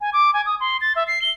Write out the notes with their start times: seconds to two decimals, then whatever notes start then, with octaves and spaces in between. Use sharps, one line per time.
0.01 G#5
0.13 D6
0.34 G#5
0.46 D#6
0.60 C6
0.81 A6
0.96 E5
1.07 C7
1.22 G7